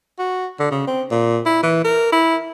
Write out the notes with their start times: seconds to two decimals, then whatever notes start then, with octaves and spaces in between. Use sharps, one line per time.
0.19 F#4
0.60 D3
0.71 C#3
0.87 C4
1.11 A#2
1.46 E4
1.63 E3
1.85 A#4
2.13 E4